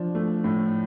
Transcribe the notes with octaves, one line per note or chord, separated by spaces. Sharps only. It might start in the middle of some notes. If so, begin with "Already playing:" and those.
Already playing: F3 D4
A3
A2